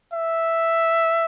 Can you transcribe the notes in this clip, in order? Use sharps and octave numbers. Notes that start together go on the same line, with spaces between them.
E5